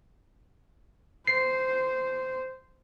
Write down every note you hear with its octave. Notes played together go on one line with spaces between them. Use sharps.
C5 C7